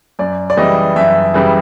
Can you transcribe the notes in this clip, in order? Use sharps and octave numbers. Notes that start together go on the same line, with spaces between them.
F#2 D5
D5
C#3 E3 G3 D#5
F#2 E5
C#3 E3 G3